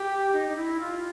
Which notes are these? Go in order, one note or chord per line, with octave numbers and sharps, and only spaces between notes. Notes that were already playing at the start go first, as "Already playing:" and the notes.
Already playing: G4
D#4
D#4
E4
F4